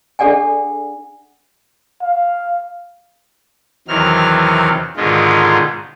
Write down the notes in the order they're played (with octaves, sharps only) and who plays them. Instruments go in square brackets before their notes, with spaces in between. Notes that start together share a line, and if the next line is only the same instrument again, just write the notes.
[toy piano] D4 G#4 A4 D5 F#5 G#5
[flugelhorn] F5
[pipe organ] E2 C3 D#3 F#3 F6
G#2 B2 D3 D#3 G#3 F4